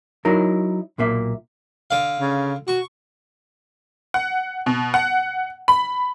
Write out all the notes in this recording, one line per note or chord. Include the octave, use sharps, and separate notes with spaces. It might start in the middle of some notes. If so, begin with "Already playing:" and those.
F#3 D#4 E4 A#4
B1 A#2 A#3 E5
D3 F5
C#3
F#4 C#6
F#5
B2
F#5
B5